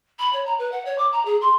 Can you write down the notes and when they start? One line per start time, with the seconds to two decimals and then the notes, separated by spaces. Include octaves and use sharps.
0.19 B5
0.33 C#5
0.45 A#5
0.58 B4
0.71 F#5
0.85 C#5
0.98 D6
1.12 A#5
1.25 G#4
1.41 C6